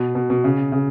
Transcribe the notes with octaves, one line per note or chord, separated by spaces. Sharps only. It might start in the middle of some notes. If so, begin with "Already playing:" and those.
Already playing: B2
B2
B2
C#3
C#3